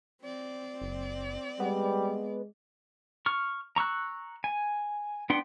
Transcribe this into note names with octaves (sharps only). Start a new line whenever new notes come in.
C4 D5
F#1
G3 G#3 B3
C#6 F6
A#5 C#6 E6 F#6
G#5
B3 D4 F#5 G5 C6